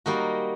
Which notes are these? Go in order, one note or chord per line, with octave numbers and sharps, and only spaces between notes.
G3 A#3 D#4 F#4